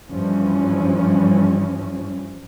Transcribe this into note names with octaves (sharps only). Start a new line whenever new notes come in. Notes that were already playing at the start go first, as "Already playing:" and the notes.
G2 E3 F3 C#4